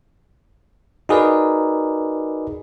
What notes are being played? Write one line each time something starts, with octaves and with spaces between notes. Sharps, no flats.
D#4 F#4 G#4 A#4 B4 D5